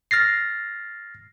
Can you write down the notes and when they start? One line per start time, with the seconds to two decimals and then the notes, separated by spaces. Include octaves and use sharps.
0.11 F6 A6 A#6 C7